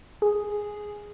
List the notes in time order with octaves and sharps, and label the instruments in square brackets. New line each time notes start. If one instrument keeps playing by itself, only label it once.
[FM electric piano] G#4